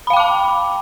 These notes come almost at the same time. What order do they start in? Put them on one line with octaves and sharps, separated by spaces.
B5 F5 G5 D6 A5